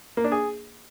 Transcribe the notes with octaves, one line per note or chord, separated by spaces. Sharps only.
A#3
D4
G#4